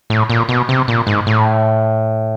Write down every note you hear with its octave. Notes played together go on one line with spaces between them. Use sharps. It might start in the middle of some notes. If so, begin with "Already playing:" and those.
A2
A#2
B2
C3
A#2
G#2
A2